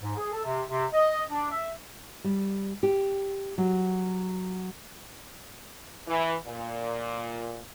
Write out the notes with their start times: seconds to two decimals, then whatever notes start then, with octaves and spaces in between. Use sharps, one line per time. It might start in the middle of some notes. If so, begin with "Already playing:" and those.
0.02 G#2
0.17 G#4
0.33 A4
0.44 C3
0.69 C3
0.93 D#5
1.30 D4
1.51 E5
2.24 G3
2.83 G4
3.58 F#3
6.08 E3
6.47 A#2